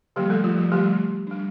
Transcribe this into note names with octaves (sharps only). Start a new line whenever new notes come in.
D3 F3 G3 A#3 G4
A3 A4
F3 F4
F3 F4
D3 F3 G3 A3 G4
G3 D4